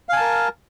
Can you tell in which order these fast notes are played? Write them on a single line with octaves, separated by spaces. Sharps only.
F5 G#5 A5 A#4